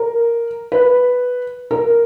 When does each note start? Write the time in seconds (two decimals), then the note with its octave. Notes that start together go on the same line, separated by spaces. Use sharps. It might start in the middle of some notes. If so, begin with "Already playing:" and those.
Already playing: A#4
0.72 B4
1.71 A#4